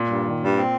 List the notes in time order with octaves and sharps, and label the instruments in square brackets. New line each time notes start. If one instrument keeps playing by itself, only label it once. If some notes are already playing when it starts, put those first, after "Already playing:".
Already playing: [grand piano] A#2
[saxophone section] G2
D#3
G2
C4